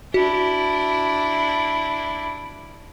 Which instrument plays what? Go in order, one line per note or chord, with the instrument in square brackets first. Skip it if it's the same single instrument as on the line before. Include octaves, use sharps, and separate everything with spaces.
[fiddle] D4 E4 [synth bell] F#4